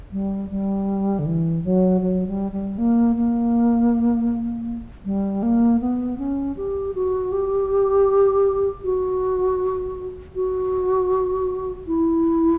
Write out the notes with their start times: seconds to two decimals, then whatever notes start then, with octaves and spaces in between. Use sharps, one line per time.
0.12 G3
0.50 G3
1.19 D3
1.26 E3
1.64 F#3
2.01 F#3
2.27 G3
2.52 G3
2.78 A#3
3.16 A#3
5.05 G3
5.43 A#3
5.81 B3
6.18 C#4
6.57 G4
6.95 F#4
7.32 G4
8.84 F#4
10.35 F#4
11.87 E4